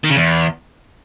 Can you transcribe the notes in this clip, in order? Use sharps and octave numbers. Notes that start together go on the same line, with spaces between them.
D#3
C#3
E2